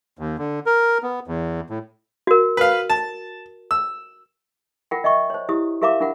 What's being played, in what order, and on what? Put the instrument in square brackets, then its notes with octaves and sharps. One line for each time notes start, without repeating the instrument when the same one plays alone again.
[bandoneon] D#2
D3
A#4
B3
E2
A2
[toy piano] F#4 A#4
[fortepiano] B4 F5
A5
E6
[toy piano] F4 A#4 F#5 G5
D#5 E5 G5 C#6
C5 C#5
E4 G4 D#6
G4 A#4 E5 F5 A#5 D6
D4 F4 A#4 F#5